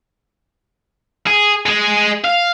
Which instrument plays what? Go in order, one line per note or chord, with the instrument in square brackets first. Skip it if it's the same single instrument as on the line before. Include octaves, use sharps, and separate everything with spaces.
[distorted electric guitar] G#4
G#3 G#4
F5